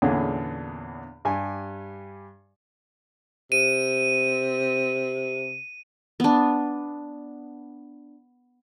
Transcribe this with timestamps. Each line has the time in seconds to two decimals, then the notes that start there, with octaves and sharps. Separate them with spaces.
0.02 E2 A#2 D3 B3 C#4 G#4
1.25 G2 G4 G#5
3.52 C3 D#7
6.20 B3 D4